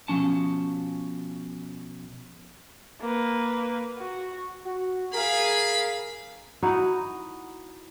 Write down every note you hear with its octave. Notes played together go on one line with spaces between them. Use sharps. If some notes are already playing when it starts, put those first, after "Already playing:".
B2 F3 C#4 A5
A#3 B4
F#4
F#4
G#4 A#4 F5 B5
D#4 E4 F#4